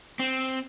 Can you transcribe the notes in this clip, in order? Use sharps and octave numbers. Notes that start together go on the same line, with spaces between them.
C4